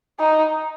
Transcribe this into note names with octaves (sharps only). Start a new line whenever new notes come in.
D#4